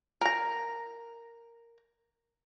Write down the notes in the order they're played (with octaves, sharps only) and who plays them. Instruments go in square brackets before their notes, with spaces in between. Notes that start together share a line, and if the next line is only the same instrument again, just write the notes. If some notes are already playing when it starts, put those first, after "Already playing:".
[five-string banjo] A#4 A#5